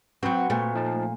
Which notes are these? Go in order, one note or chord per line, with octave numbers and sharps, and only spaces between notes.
F#3 C4 F#4 B4 C#6
A#2 A3
F3 D#4 A5